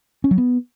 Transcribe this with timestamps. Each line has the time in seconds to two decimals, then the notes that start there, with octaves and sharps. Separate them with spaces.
0.24 C#4
0.31 F#3
0.38 B3